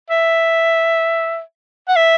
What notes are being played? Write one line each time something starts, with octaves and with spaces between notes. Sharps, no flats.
E5
F#5
E5